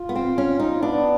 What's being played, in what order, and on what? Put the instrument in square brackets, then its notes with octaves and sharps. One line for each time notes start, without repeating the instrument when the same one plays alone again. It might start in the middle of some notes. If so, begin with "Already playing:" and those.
Already playing: [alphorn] F4
[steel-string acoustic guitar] B3
C4
C#4
D#4
[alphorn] B3 [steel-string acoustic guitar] D4